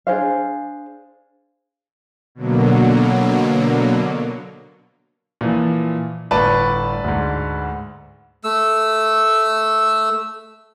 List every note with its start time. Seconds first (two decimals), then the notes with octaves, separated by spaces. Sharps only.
0.07 D4 G#4 C5 F5
2.35 B2 D3 F#3 A#3
5.41 A#2 E3 F3
6.31 G1 A2 B4 D5 A5
7.04 D2 G#2
8.44 A3 E6